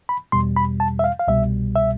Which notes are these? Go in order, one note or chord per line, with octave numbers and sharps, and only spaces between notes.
B5
E2 B2 G3 C6
B5
A5
E5
F5
F5
C2 B2 G3 E5
E5